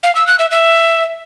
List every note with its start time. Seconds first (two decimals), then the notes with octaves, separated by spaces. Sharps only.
0.03 F5
0.15 E6
0.27 F#6
0.39 E5
0.51 E5